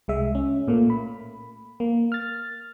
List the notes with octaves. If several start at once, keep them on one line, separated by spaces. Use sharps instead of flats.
C2 G#3 E5
C#4
A#2 A3 A#3
B5
A#3
F6 A6